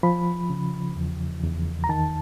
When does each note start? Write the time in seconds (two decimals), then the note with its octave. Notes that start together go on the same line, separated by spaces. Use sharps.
0.03 F3 B5
0.50 C#3
0.96 E2
1.43 E2
1.84 A#5
1.89 D#3 A5